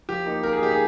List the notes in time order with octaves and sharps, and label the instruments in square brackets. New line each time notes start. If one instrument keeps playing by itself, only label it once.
[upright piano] F3 G4
A#3 D#4
F3 A#4
G#4
A#3 D#4 G4
G#4